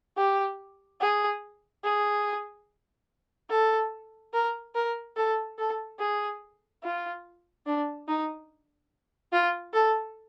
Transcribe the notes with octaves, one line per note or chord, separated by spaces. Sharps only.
G4
G#4
G#4
A4
A#4
A#4
A4
A4
G#4
F4
D4
D#4
F4
A4